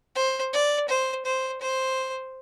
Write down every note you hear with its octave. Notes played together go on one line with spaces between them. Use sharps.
C5
D5
C5
C5
C5